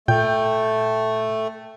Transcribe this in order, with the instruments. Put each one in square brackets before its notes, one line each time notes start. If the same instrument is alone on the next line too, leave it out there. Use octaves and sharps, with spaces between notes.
[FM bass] A#2 [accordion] A3 [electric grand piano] G5 G6